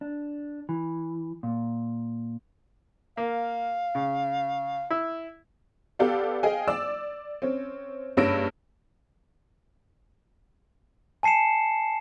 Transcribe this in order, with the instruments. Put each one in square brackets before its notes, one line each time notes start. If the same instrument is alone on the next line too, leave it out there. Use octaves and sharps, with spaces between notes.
[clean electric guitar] D4
E3
A#2
[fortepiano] A#3 [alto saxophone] F5
[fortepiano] C#3
E4
[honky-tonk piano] B3 G4 A4 D5 F5
G#4 D#5 F5 G5 G#5
D5 D6 E6
C4 C#4
F#1 G2 C#4 E6 A#6 D7
[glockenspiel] G#5 A5 C7 C#7 E7